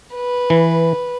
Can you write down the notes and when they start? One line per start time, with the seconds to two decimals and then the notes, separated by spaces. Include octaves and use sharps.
0.15 B4
0.50 E3